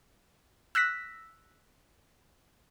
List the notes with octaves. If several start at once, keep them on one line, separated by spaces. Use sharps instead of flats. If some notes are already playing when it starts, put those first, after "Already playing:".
E6 F#6 A#6 B6